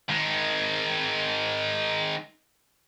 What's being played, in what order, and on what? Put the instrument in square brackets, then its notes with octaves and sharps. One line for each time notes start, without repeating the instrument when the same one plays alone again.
[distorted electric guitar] D#3 G#3